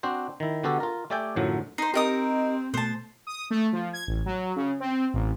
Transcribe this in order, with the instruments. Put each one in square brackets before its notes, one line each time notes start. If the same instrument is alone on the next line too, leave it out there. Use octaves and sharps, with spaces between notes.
[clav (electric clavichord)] C4 D4 F#4 C5
D#3 E4
D3 B3 F#4 G4 A4
F4 A#4
A3 G4 D5 E5 G5 G#5
F#2 A2 D3 F3 F#3
[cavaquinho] D#4 C5 [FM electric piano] C7
[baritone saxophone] C4 [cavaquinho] D#4 A#4 D#6 [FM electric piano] G4 D#5
[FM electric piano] B2 A3 [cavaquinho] C5 A5
[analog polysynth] D#6
A3
F3
G#6
A1
F#3
C#3
C4
A1